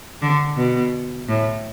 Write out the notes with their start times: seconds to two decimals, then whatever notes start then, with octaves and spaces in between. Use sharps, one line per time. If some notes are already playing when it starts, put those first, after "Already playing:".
0.22 D3
0.57 B2
1.29 A2